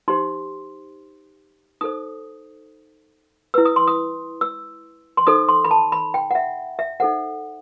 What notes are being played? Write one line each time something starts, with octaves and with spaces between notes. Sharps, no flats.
D#4 G4 C5 C6
D#4 A4 C5 D#6
E4 B4 E6
D#6
C6
D#6
E6
C6
D#4 A4 C5 D#6
C6
B5
A5
B5
G5
F#5
E5
E5
D#4 A4 C5 F#5